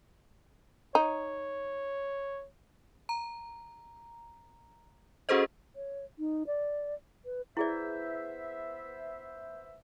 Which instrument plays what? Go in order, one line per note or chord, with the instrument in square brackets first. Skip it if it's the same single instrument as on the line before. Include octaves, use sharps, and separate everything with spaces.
[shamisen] D#4 [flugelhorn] C#5
[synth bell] A#5
C#4 F#4 G#4 A4 C5 D#5
[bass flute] C#5
D#4
D5
B4
[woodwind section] B3 C5 E5 [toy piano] E4 G#4 D5